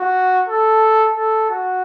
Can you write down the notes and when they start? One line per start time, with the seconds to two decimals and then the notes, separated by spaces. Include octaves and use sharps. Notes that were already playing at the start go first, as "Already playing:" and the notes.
Already playing: F#4
0.48 A4
1.16 A4
1.50 F#4